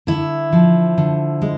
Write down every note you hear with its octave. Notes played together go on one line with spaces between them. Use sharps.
D3 E4
F3
D3
G#3